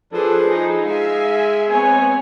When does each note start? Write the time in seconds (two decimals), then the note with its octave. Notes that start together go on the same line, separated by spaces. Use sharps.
0.13 F3 D4 G#4 A4 B4
0.46 D#4 E4 G#4
0.85 G#3 E5 F5 G#5
1.69 B3 C4 C#5 G#5